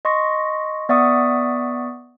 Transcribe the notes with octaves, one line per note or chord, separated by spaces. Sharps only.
D#5 C6 C#6 A#6
B3 D5 E5 F#5 C#6 D#6